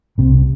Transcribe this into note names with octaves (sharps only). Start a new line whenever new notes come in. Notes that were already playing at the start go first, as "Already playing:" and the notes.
C2 C3